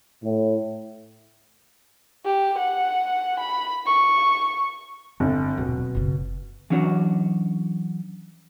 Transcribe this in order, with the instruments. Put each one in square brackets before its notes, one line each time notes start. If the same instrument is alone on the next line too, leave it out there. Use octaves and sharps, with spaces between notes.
[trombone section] A2
[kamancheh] G4
F#5
B5
C#6
[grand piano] G1 [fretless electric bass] C4
[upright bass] D#1 F#3 [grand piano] B2
[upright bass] F#1 C#3
[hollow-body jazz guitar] E3 F#3 C#4 D4 F#4